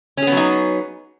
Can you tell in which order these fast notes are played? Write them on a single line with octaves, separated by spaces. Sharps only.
C#4 G#4 B3 F#3 D#4